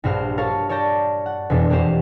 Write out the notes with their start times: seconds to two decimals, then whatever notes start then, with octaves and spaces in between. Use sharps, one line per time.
0.04 A#1 G2 F#4 C5 F6
0.38 A#4 C#5 F5 A5
0.69 C#5 D5 A5 G6 A#6
1.26 F#5
1.50 E1 F2 B2 E3 D4
1.70 A#3 F#4 G4 C5